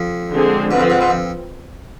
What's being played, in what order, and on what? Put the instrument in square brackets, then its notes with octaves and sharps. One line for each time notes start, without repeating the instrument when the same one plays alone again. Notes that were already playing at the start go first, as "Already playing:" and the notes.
Already playing: [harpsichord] F2
[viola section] D3 G#3 C4 G#4
[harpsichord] G#2 [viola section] C4 F4 B4
[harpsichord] F2
G#2
G#2
F2